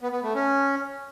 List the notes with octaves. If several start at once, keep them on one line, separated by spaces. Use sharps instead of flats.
B3
B3
A3
C#4